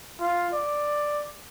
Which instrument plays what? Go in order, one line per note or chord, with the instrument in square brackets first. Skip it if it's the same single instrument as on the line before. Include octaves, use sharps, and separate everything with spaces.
[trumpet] F4
D5